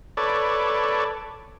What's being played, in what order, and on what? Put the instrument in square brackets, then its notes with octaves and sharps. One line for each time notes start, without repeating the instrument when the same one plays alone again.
[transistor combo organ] A4 B4 C#5 D5